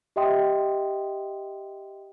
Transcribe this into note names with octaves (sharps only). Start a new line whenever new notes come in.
G4 D#5 E5 G5 C6 D#6